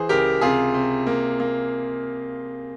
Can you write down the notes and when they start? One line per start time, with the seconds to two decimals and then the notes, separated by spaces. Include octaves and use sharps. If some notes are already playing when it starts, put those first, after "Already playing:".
Already playing: E3 G#4 C5
0.09 C#2 G4 A#4
0.41 C3 F4 G#4
0.74 C3
1.07 A#3
1.40 A#3